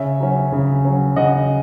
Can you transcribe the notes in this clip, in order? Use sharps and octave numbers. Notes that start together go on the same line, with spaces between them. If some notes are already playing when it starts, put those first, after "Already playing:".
Already playing: C#3 C#5 E5
F#3 C#4
C#3
F#3 C#4
C#3 D#5 F#5